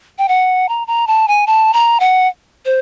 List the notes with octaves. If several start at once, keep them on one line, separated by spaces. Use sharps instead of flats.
G5
F#5
A#5
A#5
A5
G#5
A5
A#5
F#5
C5